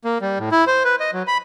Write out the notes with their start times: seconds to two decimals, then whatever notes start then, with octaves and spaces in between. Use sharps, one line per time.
0.05 A#3
0.22 G3
0.39 A2
0.52 E4
0.67 C5
0.85 B4
1.00 D#5
1.13 F#3
1.27 B5